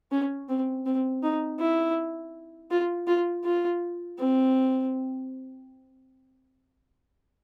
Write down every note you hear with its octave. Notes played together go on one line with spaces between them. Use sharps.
C#4
C4
C4
D#4
E4
F4
F4
F4
C4